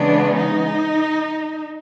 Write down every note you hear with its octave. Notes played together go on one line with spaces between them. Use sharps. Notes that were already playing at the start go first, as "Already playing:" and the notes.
Already playing: C#3 E3 G#3 B3 D4
D#4